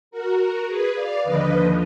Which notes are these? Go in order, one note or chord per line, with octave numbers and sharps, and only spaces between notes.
F#4 A#4
F#4 A#4
G#4 B4
D5 F5
D#2 D3 F3 B4 D#5